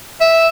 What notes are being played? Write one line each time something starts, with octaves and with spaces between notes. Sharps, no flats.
E5